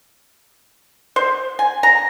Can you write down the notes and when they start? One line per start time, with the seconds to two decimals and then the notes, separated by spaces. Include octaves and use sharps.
1.16 C5
1.59 G#5
1.83 A#5